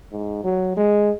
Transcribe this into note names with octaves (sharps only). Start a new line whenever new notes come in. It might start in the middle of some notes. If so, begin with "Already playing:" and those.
G#2
F#3
G#3